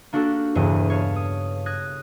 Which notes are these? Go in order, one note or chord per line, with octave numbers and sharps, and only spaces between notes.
A#3 D4 F#4 G4 A4
E1 E2 G2 C#3 B4 D#5
C#5 F5 A5
D#6
D#6 F#6 G#6 A#6